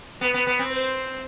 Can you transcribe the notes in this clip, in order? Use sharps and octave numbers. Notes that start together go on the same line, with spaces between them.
B3 B4
B3
B3
C4
C5